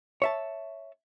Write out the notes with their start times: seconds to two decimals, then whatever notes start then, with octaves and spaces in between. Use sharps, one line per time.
0.22 C#5 E5 A5